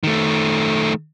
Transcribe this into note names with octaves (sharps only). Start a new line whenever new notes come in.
D#3 A3